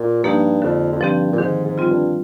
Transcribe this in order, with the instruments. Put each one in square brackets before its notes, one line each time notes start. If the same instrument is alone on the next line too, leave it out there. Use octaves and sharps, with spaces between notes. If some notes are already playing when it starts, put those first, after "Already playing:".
Already playing: [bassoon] A#2
[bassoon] G2 [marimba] F3 A#3 D#4 G4
[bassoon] F2 [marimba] D3
[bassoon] F2
[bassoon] G2 [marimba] F3 C4 G4
[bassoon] A#2
[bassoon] G#2 [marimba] D#3
[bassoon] G#2
[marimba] G3 C4 F4
[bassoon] G2